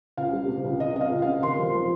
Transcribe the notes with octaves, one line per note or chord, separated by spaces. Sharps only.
C#2 F5
G3
C3
C#2
C#2 D#5
C3 D#5 F5
C#2
C3 F5
D#2 C6
F3
F3